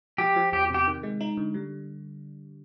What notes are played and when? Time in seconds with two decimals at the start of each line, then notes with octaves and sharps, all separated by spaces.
0.18 F3 G4
0.36 F3
0.52 E2 G4
0.70 C3 G4
0.87 D#3
1.03 G#3
1.21 D#4
1.37 D3
1.54 G3